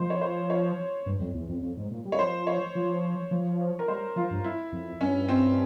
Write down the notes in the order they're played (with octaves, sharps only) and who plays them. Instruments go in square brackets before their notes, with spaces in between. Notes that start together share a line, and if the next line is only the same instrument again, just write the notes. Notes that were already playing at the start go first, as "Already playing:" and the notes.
Already playing: [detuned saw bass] F3 [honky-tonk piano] C5
[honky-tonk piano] C#5
C5
C#5
[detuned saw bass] G2
F2
E2
F2
F2
G#2
A#2
G3
[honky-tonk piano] C#5
[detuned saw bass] F3 [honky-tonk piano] C5
[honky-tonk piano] C#5
[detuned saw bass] F3
F3
[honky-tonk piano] A#4
[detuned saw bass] G3 [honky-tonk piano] C5
[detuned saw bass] F3 [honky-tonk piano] F4
[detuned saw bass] G2
[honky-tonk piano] E4
[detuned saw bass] F2
[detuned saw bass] G2 [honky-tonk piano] C#4
[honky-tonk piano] C4